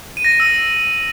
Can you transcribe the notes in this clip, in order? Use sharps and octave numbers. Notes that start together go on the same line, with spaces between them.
D#7
A#6
D#7
E6